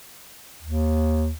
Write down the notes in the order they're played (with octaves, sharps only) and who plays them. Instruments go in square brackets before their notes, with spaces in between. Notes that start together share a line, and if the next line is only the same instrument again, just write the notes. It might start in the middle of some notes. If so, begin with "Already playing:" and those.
[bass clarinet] D#2